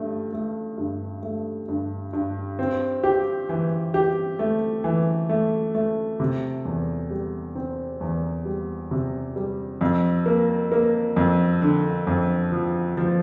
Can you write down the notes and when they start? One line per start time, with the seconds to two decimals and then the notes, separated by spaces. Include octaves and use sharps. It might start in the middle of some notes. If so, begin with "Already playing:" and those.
Already playing: G2 A3
0.33 A3
0.78 G2
1.23 A3
1.68 G2
2.13 G2
2.59 C4
3.04 G4
3.49 E3
3.94 G4
4.39 A3
4.84 E3
5.29 A3
5.75 A3
6.20 C3
6.65 E2
7.10 G3
7.55 C4
8.01 E2
8.45 G3
8.91 C3
9.36 G3
9.81 F2
10.26 A#3
10.72 A#3
11.16 F2
11.62 D3
12.07 F2
12.52 F3
12.97 F3